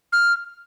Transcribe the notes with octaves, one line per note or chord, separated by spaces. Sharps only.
F6